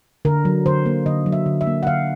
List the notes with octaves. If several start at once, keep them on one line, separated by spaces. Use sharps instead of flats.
D3 A#4
F#3
D3 C5
A#3
D3 D#5
F#3
E5
D3
E5
A#3
F#5
D3 F5